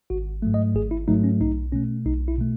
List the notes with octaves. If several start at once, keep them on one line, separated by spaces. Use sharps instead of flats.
G#1 F#4
G#2 F#3 A3
D#5
G#1 G#4
E4
G#2 F#3 A3 D#4
C#4
B1 D#4
B2 A3 C#4
B1 D#4
E4
B2 A3